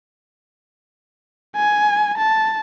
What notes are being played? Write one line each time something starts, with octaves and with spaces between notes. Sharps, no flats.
G#5
A5